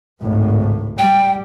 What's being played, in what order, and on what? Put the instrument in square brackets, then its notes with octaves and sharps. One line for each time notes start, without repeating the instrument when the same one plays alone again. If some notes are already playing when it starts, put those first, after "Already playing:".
[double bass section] G#1 C#2 A2
[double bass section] G3 [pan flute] G5